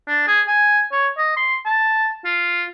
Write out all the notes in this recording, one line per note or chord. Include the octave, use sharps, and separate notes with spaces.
D4
G#4
G#5
C#5
D#5
C6
A5
F4